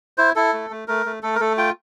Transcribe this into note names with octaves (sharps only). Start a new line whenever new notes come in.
E4 C5
E4 A4
A3
A3
A3 A#4
A3
A3 A4
A#4
A3 A4
F4 G5